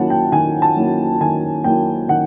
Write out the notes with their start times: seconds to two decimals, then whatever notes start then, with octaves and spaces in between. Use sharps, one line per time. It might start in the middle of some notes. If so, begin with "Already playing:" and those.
Already playing: D#3 F#3 A#3 C#4 E4 F#5 A5
0.10 G5
0.32 D#3 G#5
0.62 A5
0.76 F#3 A#3 C#4 E4
1.21 D#3 G#5
1.64 F#3 A#3 C#4 E4 G5
2.08 D#3 F#5